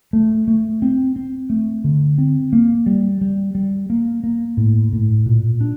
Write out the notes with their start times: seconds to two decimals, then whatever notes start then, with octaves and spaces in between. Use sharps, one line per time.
0.13 A3
0.48 A3
0.82 C4
1.16 C4
1.50 A3
1.84 D3
2.18 C4
2.53 A#3
2.86 G3
3.21 G3
3.55 G3
3.90 A#3
4.24 A#3
4.57 A2
4.93 A2
5.26 A#2
5.61 D4